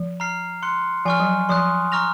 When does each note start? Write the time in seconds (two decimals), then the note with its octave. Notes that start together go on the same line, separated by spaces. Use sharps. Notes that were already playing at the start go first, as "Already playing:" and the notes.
Already playing: F3
0.20 A#5 F6 C7
0.63 C6 F#6 C#7
1.05 F3 G#5 C#6 F6
1.20 F#3
1.49 F3 C6 D#6 F#6
1.92 A#5 C#6 F6 A#6 F7